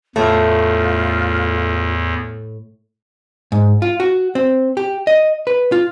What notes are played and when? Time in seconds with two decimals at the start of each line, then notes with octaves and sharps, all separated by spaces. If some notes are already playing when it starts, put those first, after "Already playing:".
0.16 E2 A2 A3 F4
3.52 G#2
3.82 F4
4.00 F#4
4.35 C4
4.77 G4
5.07 D#5
5.47 B4
5.72 F4